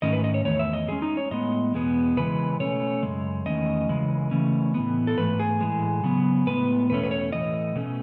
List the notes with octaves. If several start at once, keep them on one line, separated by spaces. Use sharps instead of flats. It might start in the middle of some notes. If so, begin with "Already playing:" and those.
G#2 D#3 A3 C#4 D#5
B4
D#5
C#5
E2 D#3 A3 C#5
E5
D#5
A2 G#3 C#4 G#4
D#4
C#5
A2 G#3 B3 D#5
E2 B2 G#3 B3
C#3 E3 G#3 B4
B2 A3 C#4 C#5
F#2 C#3 G#3
E2 D#3 A3 C#4 D#5
C#3 E3 G#3
C#3 E3 A3 C#4
A2 E3 B3
A4
G#2 E3 A3 B4
G#4
A2 E3 G#3
C#3 F#3 B3
A2 G#3 B3 B4
E2 B2 A3 C#4 B4
B4
C#5
A2 E3 A3 C#4 D#5
B2 A3 C#4